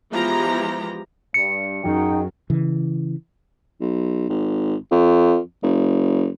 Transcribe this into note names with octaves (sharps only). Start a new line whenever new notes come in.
E3 F3 G#3 B3 G4 A#5
G2 C#7
F#2 F#3 D#4 F#4 G#4 G5
C#3 E3
B1
G#1
F2
F#1